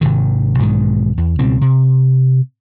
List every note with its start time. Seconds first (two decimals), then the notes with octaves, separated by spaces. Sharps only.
0.01 G#1 C3 D#3
0.58 B1 G#2 D#3 G#3
1.18 E2
1.39 C#2 B2 G3 C4
1.61 C3